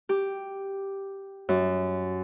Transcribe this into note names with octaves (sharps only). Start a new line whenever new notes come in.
G4
F#2